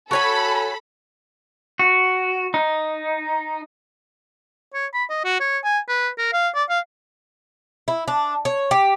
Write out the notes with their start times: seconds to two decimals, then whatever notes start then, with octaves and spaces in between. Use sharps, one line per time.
0.11 F#4 A4 C#5 G#5 B5
1.79 F#4
2.54 D#4
4.74 C#5
4.94 B5
5.10 D#5
5.24 F#4
5.40 C#5
5.64 G#5
5.88 B4
6.18 A#4
6.33 F5
6.55 D5
6.69 F5
7.88 E4
8.08 D4
8.45 C#5
8.71 G4